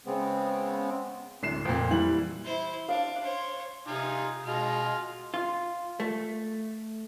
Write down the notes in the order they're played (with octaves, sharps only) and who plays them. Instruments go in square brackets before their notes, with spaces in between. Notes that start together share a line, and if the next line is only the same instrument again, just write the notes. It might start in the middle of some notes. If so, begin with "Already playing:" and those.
[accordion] C#3 G#3 B3 C4
[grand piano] D1 C7 E7
F2 A#2
E3 G3 F#7
[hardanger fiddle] E4 C5
[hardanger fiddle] D4 [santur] F5
[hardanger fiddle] C5 C#5
[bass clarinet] C3 [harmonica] D#4 F4 G#5
[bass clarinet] B2 [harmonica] G#3 F4 F6
[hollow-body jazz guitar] F4
A3